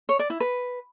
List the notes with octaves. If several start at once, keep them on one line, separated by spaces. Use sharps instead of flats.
C#5
D5
E4
B4